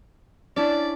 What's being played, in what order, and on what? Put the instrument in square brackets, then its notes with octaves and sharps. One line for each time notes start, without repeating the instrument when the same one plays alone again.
[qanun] C#4 D4 E4 [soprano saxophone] D5